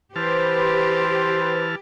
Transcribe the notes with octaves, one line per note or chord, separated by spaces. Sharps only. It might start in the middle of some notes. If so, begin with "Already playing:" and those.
E3 G4 B4 C5 A5 F6